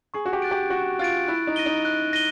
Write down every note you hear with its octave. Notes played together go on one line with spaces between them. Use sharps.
G#4 C#6
F#4
G4
F#6 A6 D7
G4
F#4 C#6
F4 F#6 A6 D7
E4 F#6
D#4
A#6 D#7 G7
D#4
F#6
A#6 D#7 G7